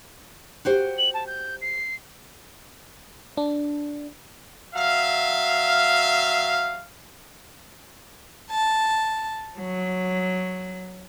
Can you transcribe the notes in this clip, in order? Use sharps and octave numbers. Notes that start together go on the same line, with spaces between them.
F#4 G4 C5
F#7
A5
G6
C7
D4
F#3 E5 F5
A5
F#3